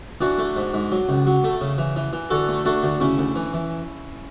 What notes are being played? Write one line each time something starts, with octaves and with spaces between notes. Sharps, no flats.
E3 D4 F#4
A3
G#2
G#2
F#3
C#2
F#3
A3
C#3
E3
E3
E3
D3 F#4 A4
A3
A3 D4 F#4
D2
C#3 C#4 E4
D2
E3
E3